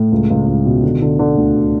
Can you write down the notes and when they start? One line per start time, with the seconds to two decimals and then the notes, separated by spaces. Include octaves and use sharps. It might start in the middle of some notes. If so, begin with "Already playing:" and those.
Already playing: A2
0.12 C#2
0.30 C#2
0.47 C#2
0.66 B2
0.83 D3
1.02 D3
1.19 D3
1.37 D2